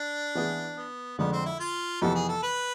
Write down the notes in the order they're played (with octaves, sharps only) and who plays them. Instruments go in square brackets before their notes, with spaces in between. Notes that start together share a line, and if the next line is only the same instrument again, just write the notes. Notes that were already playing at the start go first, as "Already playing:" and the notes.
Already playing: [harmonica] D4
[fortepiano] E3 B3 E4 G#4 B4
[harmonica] B3
[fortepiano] F2 D3 G#3 [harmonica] B3
[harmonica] C4
E4
F4
[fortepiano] F2 C3 E3 B3 [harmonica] A4
[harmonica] G#4
A4
B4